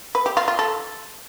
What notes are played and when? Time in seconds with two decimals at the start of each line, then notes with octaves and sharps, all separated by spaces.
0.15 B4
0.26 G4
0.37 F4
0.48 F4
0.59 A4